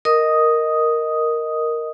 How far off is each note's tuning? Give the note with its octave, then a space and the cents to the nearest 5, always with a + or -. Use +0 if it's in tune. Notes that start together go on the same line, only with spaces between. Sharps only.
A#4 +0 D#5 +0 D#6 +0